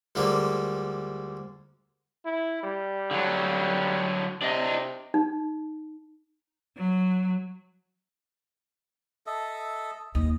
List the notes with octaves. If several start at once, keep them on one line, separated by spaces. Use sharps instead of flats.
D2 F3 G3 G#3 A#3
E4
G3
D3 F#3
C3 D4 D#5
D#4
F#3
A4 D#5 E5
D#2 D#5